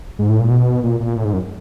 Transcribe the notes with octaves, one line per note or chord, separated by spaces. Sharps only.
G#2
A2
A#2
B2
A#2
A#2
A2
G#2
F#2